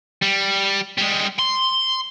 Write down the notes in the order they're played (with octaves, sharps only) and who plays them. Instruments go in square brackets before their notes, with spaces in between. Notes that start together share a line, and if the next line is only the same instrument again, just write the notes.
[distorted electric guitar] G3
G3 G#3
C6